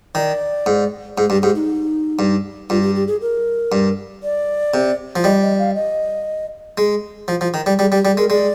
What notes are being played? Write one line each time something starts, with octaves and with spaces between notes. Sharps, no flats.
D#3 D5
G#2
G#2 G#4
G2 G4
G#2 G4
D#4
G2
G2 F4
G4
G4
G#4
A#4
G2
D5
C3
F3
G3 D#5
D#5
F5
D#5
G#3
F3
F3
D#3
G3
G3 G#4
G3 G4
G3
G#4
G#3 A#4
G#3 D5